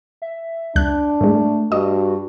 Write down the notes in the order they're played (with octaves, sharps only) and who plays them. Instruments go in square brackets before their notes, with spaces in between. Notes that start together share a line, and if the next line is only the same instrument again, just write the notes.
[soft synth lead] E5
[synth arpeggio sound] C#2 F#6 [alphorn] D4
[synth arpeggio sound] A2 G#3 [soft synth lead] A3
[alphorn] G2 [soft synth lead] F#4 [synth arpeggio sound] D#5